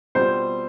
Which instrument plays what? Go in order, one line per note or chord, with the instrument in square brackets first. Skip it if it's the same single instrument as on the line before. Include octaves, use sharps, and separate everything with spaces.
[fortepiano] B2 G3 C4 F4 [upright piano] C5